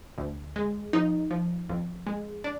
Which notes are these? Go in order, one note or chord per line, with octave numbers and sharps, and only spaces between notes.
D2
G#3
F3 D#4
F3
F2
G#3
D4